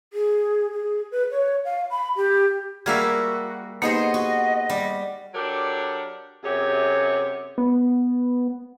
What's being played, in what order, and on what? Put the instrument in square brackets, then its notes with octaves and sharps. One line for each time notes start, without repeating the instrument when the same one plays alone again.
[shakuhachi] G#4
G#4
B4
C#5
F5
B5
G4
[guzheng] G3 A#3 E5 [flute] F#4 [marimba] G#4 F6 G#6
[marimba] A#3 D#4 G4 [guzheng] B3 G#4 C5 [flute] D#5
[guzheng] F#4
G3
[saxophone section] F#3 D4 G4 A4 A#4
F#2 C3 G4 G#4 C#5
[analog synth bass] B3